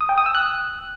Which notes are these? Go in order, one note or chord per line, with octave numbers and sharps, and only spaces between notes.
D#6
G5
D#6
E6
F#6